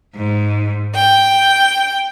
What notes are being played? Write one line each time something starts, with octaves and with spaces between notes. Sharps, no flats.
G#2
G5